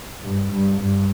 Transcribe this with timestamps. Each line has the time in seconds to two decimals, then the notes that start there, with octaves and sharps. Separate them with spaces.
0.23 G2
0.52 G2
0.80 G2